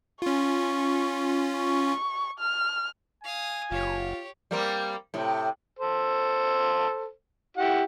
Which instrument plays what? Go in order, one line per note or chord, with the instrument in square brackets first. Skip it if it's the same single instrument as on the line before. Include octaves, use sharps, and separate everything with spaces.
[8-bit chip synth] C#4 F4 [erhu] C#6
[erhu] C#6
F6
[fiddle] F5 D#6 [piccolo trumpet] G#5
[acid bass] F#1 [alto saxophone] F4 [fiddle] G4 C#5
[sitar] G3 A#3 C4
A2 C3
[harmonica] A4 C5
E4 G4 F#5